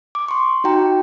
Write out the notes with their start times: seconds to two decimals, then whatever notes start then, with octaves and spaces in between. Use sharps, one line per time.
0.15 D6
0.28 C6 C#6
0.64 D#4 F#4 G5 A#5